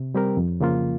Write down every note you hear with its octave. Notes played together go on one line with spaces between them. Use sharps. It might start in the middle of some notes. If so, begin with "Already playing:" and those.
Already playing: C3
G3 C4 G4 A#4
F2
C#3 F3 A#3 F4